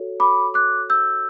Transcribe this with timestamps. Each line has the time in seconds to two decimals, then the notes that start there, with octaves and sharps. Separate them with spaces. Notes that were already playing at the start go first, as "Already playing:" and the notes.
Already playing: F#4 A4 C#5
0.20 B5 D6
0.54 D6 F#6
0.90 E6 G6